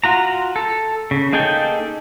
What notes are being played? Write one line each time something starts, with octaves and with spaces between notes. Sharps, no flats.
F4 F#4 A#5
A4
C#3
A#3 D#4 G#4 A4 G5